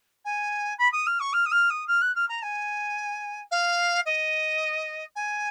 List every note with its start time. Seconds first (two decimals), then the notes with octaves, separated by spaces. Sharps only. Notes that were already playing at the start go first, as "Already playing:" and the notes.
0.25 G#5
0.78 B5
0.92 D#6
1.06 F6
1.20 C#6
1.33 F6
1.45 D#6
1.51 F6
1.70 D#6
1.87 F6
2.01 F#6
2.15 F6
2.28 A#5
2.42 G#5
3.51 F5
4.05 D#5
5.15 G#5